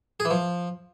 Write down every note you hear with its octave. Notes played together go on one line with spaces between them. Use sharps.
G#4
E3
F3